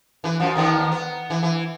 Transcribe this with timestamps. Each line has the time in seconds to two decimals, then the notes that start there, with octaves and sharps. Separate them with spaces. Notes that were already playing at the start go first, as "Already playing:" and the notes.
0.24 E3 B4
0.40 F#2 F3
0.55 D#2 D#3 B3
0.91 B3
1.30 E3
1.43 E3